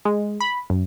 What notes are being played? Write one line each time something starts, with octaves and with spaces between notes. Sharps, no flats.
G#3
B5
F#2